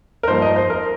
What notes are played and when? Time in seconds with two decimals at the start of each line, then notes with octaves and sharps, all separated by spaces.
0.23 A#4
0.28 G2 F3 A#3 D#4 C5
0.42 D#5
0.56 C5
0.70 A#4